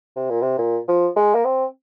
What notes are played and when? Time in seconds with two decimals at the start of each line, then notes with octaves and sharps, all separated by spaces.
0.16 C3
0.30 A#2
0.42 C3
0.58 A#2
0.88 F3
1.16 G#3
1.35 A#3
1.45 C4